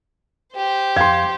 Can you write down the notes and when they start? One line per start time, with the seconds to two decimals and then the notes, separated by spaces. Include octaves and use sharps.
0.54 G4 C5
0.96 F2 F5 C6 G#6